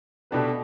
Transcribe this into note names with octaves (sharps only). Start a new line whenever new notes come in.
B2 A3 D4 G4 B4